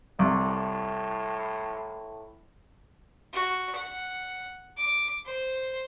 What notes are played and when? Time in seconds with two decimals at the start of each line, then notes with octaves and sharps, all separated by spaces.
0.19 C2 A2
3.33 F#4
3.75 F#5
4.77 D6
5.26 C5